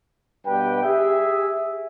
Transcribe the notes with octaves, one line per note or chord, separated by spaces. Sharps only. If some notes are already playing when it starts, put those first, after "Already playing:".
G2 B2 G4 B4 G5
G4 G#4 E5